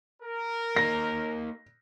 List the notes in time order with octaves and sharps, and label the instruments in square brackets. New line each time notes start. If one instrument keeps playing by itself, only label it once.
[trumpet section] A#4
[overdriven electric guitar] A#3 D#4 [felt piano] A#6